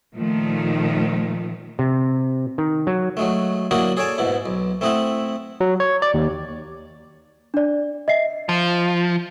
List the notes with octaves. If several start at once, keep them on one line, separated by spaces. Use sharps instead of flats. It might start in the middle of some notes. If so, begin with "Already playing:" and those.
A#2 D#3 F3 A3
C3
D#3
F#3
F#3 G#3 A3
F#3 A#3 D4 E4 F#4 D#5
G#4 A4 C#5 D5 G#5 A5
G#2 B2 E4
B1
A3 C4 E4 D#5 E5 F#5
F#3
C#5
D5
D#2
D4 D5
D#5 E5 C7
F3